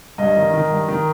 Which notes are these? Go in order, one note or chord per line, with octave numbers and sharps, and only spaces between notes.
G2 D#5
D#3
D#3
G2
D#3